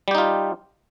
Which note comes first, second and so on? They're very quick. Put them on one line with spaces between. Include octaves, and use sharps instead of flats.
G3 G4 D#4 F4